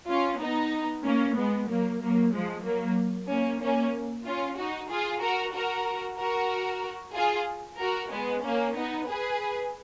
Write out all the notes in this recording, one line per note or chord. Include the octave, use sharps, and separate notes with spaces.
C#4 F4
B3 D#4
A#3 C#4
G#3 B3
F#3 A#3
F#3 A#3
F3 G#3
F#3 A#3
A#3 C#4
A#3 C#4
C#4 F4
D#4 F#4
F4 G#4
F#4 A#4
F#4 A#4
F#4 A#4
F4 G#4
F#4 A#4
G#3 B3
A#3 C#4
B3 D#4
G#4 B4